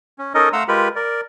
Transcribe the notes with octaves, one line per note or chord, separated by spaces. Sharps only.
C#4
C#4 D#4 A4 A#4 D#5
A3 F5 F#5 A#5 C6 E6
G#3 F4 G4 A#4 B4 B5
A#4 D5